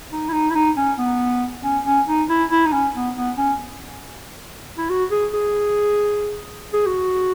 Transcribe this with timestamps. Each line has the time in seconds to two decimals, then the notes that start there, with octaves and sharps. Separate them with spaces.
0.12 D#4
0.29 E4
0.33 D#4
0.50 E4
0.55 D#4
0.77 C#4
0.98 B3
1.63 C#4
1.85 C#4
2.08 D#4
2.29 E4
2.50 E4
2.66 D#4
2.72 C#4
2.94 B3
3.16 B3
3.37 C#4
4.78 E4
4.89 F#4
5.11 G#4
5.33 G#4
6.73 G#4
6.86 F#4